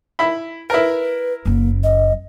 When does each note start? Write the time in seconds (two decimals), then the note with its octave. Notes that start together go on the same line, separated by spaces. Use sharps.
0.19 E4 B5
0.70 E4 A#4 B4
1.45 F#1 F#2 A#3
1.84 D#5